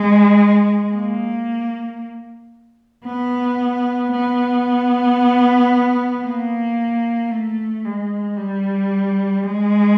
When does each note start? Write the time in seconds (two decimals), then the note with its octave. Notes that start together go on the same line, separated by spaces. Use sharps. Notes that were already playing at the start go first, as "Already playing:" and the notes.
Already playing: G#3
0.93 A#3
3.05 B3
4.12 B3
6.24 A#3
7.31 A3
7.85 G#3
8.37 G3
9.43 G#3